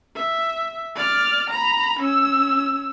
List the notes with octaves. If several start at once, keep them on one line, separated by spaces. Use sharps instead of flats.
E5
D5 F6
A#5 B5
C#4 E6